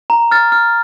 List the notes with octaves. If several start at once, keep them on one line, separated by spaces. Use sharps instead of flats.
A#5
F6 A6
F6